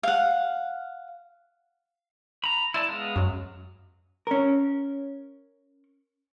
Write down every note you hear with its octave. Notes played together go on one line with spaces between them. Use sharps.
F5 F#5
A#5 B5
E4 D5 A5 C6
G#3 B3 F5
F#2 F#3
C#4 A#4